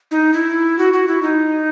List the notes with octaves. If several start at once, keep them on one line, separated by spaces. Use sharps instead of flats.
D#4
E4
F#4
F#4
E4
D#4